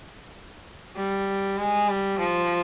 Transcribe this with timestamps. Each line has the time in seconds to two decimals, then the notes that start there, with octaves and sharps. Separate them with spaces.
0.96 G3
1.58 G#3
1.89 G3
2.19 F3